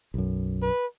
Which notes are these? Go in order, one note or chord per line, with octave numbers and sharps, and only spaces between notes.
B1 F#2
B4